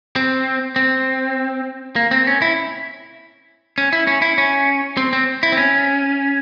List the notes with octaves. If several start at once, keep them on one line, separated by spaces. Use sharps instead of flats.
C4
C4
A#3
C4
C#4
E4
C#4
E4
C#4
E4
C#4
C4
C4
E4
C4
C#4